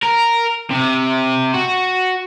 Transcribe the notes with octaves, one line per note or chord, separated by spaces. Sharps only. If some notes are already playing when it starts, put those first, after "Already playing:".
A#4
C3
F#4